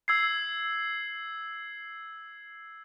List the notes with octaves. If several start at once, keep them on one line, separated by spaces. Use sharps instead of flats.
E6 G#6 C7